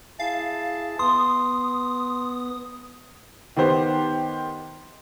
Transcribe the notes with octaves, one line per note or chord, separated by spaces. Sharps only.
E4 G#4 F5 A5
B3 C6 D#6
D#3 B3 G4 C5